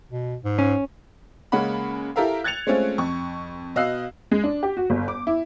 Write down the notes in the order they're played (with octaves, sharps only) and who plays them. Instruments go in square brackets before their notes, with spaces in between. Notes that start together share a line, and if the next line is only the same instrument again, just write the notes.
[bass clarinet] B2
G#2
[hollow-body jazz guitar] C#4
[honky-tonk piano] C#3 G#3 A#3 C#4 F#5 B5
E4 G4 A4 A#4 E5 F5
F#6 G#6 A6 C#7 F7
G#3 A3 C4 C#4 F4
F2 C#6
B2 D#5 F5 E6 F#6 C7
G#3
D4
G4
F#4
G1
D6
E4